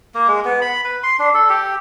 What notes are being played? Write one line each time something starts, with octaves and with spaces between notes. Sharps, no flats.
A#3
G#3
B3
B5
B4
C6
D4
A4
G4